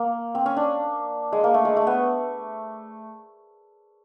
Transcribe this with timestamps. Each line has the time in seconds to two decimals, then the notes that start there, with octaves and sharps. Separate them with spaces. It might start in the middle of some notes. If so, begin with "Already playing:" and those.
Already playing: A#3
0.35 C4
0.46 C#4
0.57 D4
1.32 G#3
1.44 A#3
1.54 A3
1.65 G#3
1.76 A3
1.87 B3